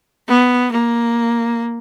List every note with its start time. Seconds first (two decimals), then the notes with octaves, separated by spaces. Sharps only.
0.28 B3
0.71 A#3